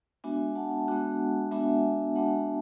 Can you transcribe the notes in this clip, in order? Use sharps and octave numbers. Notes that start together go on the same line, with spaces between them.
G#3 B3 D4 F#4 E5 G#5
F#5 A5
G#3 B3 D4 F#4
G#3 B3 D4 F#4 E5 G#5
G#3 B3 D4 F#4 F#5 A5